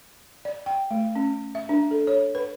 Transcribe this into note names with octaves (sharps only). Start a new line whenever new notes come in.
D5
G5
A3
C#4
E5
D4
A4
C#5
B4